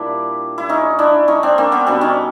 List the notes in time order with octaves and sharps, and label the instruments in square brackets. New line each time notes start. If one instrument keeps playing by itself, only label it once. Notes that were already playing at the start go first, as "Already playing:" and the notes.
Already playing: [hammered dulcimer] A#2 G3 D4 E4
E4
C#4 D#4
D4 E4
C#4 D#4
C4 D4
A#3 C4
B3 C#4
B2 G3 C4 D4
C#4 D#4